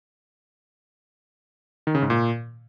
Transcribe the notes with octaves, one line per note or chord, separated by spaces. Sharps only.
D#3
C#3
G#2
A#2